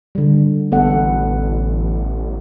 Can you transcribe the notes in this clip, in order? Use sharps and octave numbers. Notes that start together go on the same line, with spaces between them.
D3 G3
A1 B3 A4 F#5